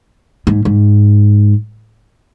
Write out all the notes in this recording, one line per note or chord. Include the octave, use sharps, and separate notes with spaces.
G#2
G#2